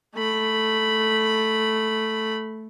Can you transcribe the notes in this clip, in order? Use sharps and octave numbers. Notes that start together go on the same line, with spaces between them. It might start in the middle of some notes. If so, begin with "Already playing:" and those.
A3 B5